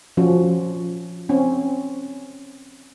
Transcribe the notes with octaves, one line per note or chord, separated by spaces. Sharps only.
F3 C#4 F#4
C4 C#4